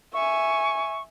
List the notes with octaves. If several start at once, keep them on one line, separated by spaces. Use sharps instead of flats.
E5 G#5 C#6